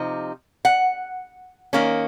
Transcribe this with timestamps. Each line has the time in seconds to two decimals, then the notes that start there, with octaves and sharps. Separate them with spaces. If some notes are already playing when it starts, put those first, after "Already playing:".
Already playing: C3 F3 D#4
0.65 F#5
1.73 D#3 A#3 C#4